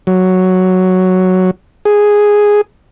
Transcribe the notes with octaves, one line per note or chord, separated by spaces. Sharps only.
F#3
G#4